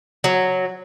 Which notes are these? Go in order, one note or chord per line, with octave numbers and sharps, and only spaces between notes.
F#3